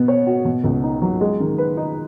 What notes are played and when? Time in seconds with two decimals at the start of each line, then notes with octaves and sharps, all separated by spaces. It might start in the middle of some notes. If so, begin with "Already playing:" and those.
Already playing: B2 B3
0.08 C#5
0.27 F#4
0.45 B2
0.64 C#2
0.83 D#4
1.02 F#3
1.21 G#3
1.40 D#3
1.58 B4
1.77 D#4